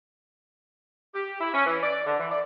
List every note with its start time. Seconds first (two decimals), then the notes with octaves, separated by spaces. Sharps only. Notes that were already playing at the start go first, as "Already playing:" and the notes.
1.15 G4
1.41 E4
1.54 C#4
1.66 E3
1.83 D5
2.06 D3
2.20 E3
2.32 D5